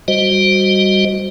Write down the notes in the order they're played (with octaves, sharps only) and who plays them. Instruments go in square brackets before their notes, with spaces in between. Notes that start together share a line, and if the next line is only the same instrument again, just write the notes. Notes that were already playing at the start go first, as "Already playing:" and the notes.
[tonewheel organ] G3 F#4 C5 D#5